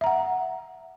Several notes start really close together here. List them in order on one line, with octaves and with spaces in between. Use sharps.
E5 A#5 F#5